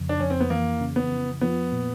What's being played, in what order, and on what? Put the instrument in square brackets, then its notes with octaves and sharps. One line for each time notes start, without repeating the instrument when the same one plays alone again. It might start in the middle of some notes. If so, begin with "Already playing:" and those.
Already playing: [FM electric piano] F2 C#3
[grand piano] D4
[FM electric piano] F2 [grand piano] C#4
[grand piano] C4
B3
[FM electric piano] E3 [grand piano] A#3
[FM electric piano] C#3
[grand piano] B3
[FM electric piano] F2
[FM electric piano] F3 [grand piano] B3
[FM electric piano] A#2